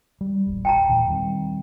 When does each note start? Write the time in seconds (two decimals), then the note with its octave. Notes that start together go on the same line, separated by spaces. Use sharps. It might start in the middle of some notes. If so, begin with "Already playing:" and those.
0.21 G3
0.46 D#1 A1
0.65 G5 A5 A#5
0.89 D#2 A#2 E3
1.08 D#3 G3 C4